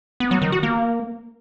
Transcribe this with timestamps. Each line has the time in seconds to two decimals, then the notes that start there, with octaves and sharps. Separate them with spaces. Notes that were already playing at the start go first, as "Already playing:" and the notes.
0.20 B3
0.31 F#3
0.42 D#3
0.52 F#4
0.63 A#3